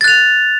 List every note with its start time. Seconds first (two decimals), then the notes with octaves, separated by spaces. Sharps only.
0.01 A6
0.04 F#6
0.08 F7